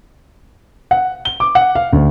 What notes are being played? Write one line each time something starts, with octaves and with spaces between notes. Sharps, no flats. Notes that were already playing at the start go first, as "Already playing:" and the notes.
F#5
G7
D6
F#5
F5
D2